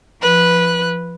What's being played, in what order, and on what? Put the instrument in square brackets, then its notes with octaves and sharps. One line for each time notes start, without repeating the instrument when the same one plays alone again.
[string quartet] F3 B4 F#6